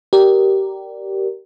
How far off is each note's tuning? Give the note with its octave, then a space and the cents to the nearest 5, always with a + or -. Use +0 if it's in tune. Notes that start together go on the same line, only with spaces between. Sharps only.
G4 -20 A#4 +0 D5 +0